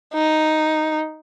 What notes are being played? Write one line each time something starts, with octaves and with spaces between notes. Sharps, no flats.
D#4